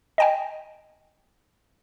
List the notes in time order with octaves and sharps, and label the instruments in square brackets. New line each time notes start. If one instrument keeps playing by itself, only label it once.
[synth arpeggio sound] D#5 G5 G#5